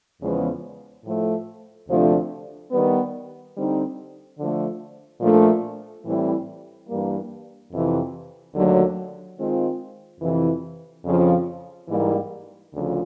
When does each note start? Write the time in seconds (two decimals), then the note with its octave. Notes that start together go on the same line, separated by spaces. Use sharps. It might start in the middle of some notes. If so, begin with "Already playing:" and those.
0.21 E2 C#3 F3 G#3 B3
1.04 A2 F3 A3
1.87 D2 C3 F3 A3 D4
2.71 D#3 G3 B3
3.54 D3 G3 C4 D#4
4.37 D3 F3 A3
5.21 A#2 F3 A3 D4
6.04 A2 E3 G3 C4 E4
6.87 G2 E3 G3 A#3
7.71 F2 C3 E3
8.54 D#2 D3 F#3 A3
9.37 D#3 G#3 C4 F4
10.21 F2 C3 E3
11.05 F2 C#3 F3
11.87 G#2 E3 G3 A#3
12.71 D2 C#3 F3